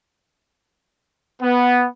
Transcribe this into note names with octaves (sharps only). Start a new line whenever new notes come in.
B3